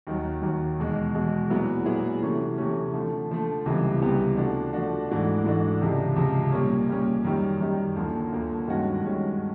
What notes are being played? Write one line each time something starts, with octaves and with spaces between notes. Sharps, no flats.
D#2 D#3 F#3
D#2 D#3 F#3
E2 B2 G#3
E2 B2 G#3
A#2 F#3 B3 E4 G#4
A#2 F#3 B3 E4 G#4
C3 E3 A3 C#4
C3 E3 A3 C#4
D3 F3 A3
D3 F3 A3
C#2 C3 E3 G3 B3
C#2 C3 E3 G3 B3
F3 A3 D4 F#4
F3 A3 D4 F#4
G#2 E3 A3 D4 F#4
G#2 E3 A3 D4 F#4
C#2 C3 F3
C#2 C3 F3
A#2 G3 A#3 C#4
A#2 G3 A#3 C#4
F#2 D#3 G3
F#2 D#3 G3
D2 D3 F3 A#3
D2 D3 F3 A#3
G2 D#3 G#3 C#4 F#4
G2 D#3 G#3 C#4 F#4